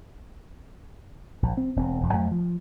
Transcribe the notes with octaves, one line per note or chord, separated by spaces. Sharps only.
A#1
C4
E1 C4
E1 F2
F2 F#3 A3
F3